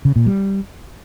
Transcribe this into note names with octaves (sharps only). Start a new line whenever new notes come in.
C#3
A#2
G3